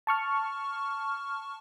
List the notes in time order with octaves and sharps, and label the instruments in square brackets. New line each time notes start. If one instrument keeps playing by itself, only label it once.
[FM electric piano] A5 C#6 F6